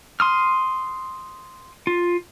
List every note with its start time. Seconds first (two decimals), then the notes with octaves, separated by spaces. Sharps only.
0.20 C6 D#6 F6
1.87 F4